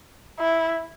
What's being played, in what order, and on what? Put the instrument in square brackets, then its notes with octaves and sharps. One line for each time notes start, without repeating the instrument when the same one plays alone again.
[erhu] E4